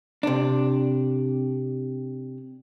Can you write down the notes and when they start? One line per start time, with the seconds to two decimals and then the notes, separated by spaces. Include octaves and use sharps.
0.23 C3 D4